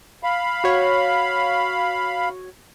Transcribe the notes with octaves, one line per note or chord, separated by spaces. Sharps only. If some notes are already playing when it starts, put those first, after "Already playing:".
F5 B5
F#4 C#5